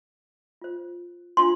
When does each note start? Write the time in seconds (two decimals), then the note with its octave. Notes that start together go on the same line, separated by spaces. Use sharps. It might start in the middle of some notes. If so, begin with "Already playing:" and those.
0.61 F4 C5
1.37 D4 F4 C5 C6